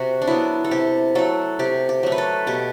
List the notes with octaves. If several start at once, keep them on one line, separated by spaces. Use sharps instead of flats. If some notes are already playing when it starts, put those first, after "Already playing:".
Already playing: C3 F#4
D4
F#3 B3 E4
A4
C3 G4
F#3 A3 A4
C3 G4
G4
F#3 A3
B4
A4
B2 G4